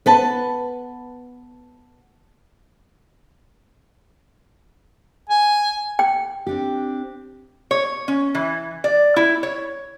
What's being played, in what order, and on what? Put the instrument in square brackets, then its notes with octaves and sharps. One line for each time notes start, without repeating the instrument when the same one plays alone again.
[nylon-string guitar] B3 B4 A5
[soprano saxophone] G#5
[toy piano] G5
[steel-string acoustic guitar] C4 D4 G4
[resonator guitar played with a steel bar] C#5
C#4
E3
D5
E4
C#5